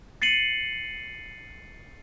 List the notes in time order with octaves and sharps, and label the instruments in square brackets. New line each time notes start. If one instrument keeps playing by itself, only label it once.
[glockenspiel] A6 C7 C#7 D#7 F#7